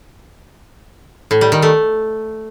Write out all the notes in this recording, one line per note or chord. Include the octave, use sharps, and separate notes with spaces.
A2
G3
D#3
A3